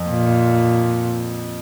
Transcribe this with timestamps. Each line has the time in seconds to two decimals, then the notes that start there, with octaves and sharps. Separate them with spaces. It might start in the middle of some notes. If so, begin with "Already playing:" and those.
Already playing: F2
0.09 A#2